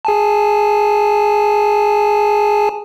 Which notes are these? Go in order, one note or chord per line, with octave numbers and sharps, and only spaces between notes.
G#4 G#5 A5